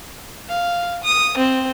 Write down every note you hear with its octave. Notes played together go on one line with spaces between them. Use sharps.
F5
D#6
C4